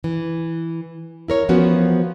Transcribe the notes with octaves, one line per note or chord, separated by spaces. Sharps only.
E3
E4 A#4 C#5
E3 F3 B3 C#4 F#4 A#4